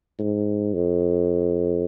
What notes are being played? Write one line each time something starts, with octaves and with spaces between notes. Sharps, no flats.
G#2
F2